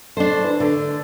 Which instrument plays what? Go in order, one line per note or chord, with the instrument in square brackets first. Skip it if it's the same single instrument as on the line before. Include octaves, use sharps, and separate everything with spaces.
[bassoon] A3 [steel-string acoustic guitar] D4 C5
[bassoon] E3
[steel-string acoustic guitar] D3 [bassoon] A3